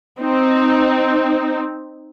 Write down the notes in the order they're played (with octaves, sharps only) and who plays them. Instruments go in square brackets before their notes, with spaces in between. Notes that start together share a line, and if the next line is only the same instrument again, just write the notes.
[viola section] C4 D#4